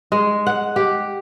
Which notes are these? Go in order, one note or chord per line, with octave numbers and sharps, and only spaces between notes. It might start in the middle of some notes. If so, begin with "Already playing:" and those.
G#3
F#5
G4